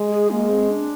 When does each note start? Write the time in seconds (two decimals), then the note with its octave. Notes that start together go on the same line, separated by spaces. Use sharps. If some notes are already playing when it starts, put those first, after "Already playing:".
Already playing: G#3
0.11 G#4
0.31 G#3 A#3
0.50 C4
0.69 D4